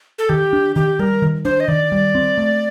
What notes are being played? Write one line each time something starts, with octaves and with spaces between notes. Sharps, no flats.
A4
D#3 G4
D4
D#3 G4
G3 A#4
D#3
D4 C5
D#5
D#3 D5
G3
C4
A3